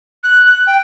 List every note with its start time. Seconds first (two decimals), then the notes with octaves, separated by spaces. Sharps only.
0.23 F#6
0.45 F#6
0.67 G5